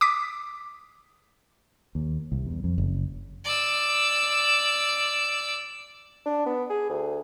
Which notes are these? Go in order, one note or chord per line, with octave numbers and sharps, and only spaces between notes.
D6 D#6 B6
D#2
C2
E2
F2
F#1
D5 E6
D4
B3
G#4
D2